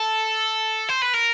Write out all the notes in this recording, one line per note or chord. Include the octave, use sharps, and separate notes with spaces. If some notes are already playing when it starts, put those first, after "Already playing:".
Already playing: A4
C5
B4
A#4